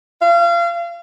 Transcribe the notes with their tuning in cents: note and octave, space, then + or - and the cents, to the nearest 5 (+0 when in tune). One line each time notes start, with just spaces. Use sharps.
F5 -30